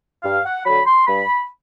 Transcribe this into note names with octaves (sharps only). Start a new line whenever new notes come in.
G2 F5
F#5
D3 F#3 B5
C6
G2 B5